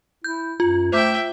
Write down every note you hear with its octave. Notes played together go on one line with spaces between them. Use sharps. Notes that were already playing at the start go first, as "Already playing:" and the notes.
E4 G6
F#2 F4
A3 C5 E5 G5 D6 G6